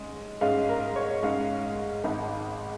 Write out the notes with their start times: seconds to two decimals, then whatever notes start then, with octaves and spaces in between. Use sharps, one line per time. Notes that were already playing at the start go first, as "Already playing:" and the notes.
Already playing: G#2 G#3 C#4
0.41 G#2 G#3 C#4 F5
0.69 A#4
0.96 C#5
1.23 G#2 G#3 C#4 F5
2.04 G#1 G#2 G#3